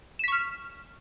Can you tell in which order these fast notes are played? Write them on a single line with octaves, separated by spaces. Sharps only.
E7 B6 C#6 F6